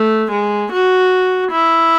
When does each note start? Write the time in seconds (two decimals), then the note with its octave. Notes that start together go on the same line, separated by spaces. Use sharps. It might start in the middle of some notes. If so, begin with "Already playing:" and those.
Already playing: A3
0.32 G#3
0.72 F#4
1.51 E4